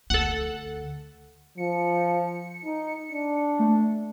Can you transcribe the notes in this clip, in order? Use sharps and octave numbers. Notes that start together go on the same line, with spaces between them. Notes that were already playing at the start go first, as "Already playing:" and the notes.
D2 A4 F#5
F3 C#7
D#4
D4
A3